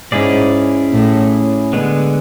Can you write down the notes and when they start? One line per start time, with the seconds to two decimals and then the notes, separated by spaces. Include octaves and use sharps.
0.12 G#2 C#4 E4 G#4 D5
0.93 A2
1.73 D3 G#3 B3